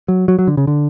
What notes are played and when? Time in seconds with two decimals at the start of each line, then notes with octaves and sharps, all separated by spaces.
0.08 F#3
0.28 F#3
0.39 F#3
0.47 D3
0.57 C#3
0.67 D3